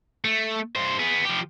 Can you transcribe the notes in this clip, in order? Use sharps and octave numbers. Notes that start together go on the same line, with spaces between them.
A3
G2 C5
B3 G#4
F3 G4